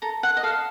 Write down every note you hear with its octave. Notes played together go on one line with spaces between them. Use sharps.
A4 A#5
F#5
D#5
A4 F5